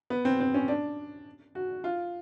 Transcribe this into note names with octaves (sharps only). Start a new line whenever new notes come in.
B3
C4
C4
C#4
D4
F#4
F4